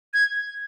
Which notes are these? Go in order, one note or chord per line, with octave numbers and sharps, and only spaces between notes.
G#6